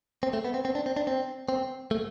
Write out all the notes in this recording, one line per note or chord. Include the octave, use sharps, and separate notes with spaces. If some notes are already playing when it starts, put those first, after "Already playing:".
C4
A3
B3
C4
C4
D4
C4
D4
C4
C4
A3